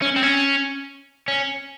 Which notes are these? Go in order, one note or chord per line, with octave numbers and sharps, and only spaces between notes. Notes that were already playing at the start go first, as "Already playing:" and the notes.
C#4
C4
C#4
C#4